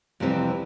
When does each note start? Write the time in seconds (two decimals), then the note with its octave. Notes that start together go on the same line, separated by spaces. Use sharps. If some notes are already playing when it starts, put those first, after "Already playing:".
0.20 F2 C3 E3 G3 C4